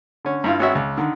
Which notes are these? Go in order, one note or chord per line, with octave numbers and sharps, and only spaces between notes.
D3 C#4
G2 E4 F4
G#1 C#4 F#4 E5
C#2
D3 D#3